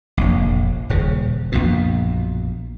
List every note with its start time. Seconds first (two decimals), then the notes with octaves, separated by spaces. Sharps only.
0.17 F1 A#1
0.89 D#1 C#3
1.52 A#1 F#2 B2